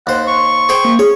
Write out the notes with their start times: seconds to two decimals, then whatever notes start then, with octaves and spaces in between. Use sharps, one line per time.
0.07 D#2 C5 F#5
0.28 C6 C#6
0.69 G#4 C5 G5
0.85 A#3
0.99 G#4 C#5